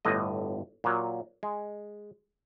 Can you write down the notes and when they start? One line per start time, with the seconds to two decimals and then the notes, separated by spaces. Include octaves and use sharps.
0.05 G1 A2 D3 D#5
0.84 A#2 F#3
1.43 G#3